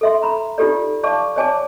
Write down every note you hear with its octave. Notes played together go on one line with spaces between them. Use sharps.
A4 E5 C6
A#5 B5
D#4 F4 G4 A4 D5
D5 F5 A5 C#6 D6
C#5 D5 G#5 A5 D6